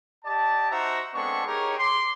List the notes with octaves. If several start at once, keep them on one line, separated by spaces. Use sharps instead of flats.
G4 D5 D#5 A5
D#4 F#4 C5 E5 F#5 A#5
G#3 B3 C4 D4 A4 C#6
D#4 G4 G#4 A#4 C#5
C6 D6